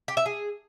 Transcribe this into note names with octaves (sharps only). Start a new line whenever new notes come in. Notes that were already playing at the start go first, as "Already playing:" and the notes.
G4
E5
G#4